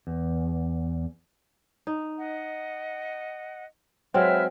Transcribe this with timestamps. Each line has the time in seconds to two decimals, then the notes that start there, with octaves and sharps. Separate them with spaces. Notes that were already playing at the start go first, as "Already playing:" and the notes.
0.07 E2
1.87 D#4
2.18 D#5 F#5
4.14 F#3 G#3 C4 B4 E5 F6